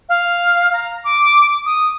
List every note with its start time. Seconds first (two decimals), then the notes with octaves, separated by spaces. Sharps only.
0.08 F5
0.72 A#5
1.04 D6
1.65 D#6